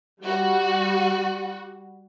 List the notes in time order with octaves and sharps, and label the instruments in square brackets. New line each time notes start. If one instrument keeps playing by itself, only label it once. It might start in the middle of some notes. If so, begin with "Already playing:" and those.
[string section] G3 F#4